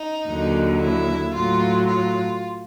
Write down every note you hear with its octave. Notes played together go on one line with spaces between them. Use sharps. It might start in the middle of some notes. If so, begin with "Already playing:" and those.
Already playing: D#4
D#2 D3 F#3
E4
A2 F#3 F4
F4